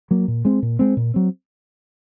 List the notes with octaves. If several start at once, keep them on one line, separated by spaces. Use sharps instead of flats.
F#3 A#3
A#2
G#3 C4
A#2
G#3 C4
A#2
F#3 C4